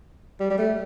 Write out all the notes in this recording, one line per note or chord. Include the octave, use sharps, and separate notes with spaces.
G3
G3
A3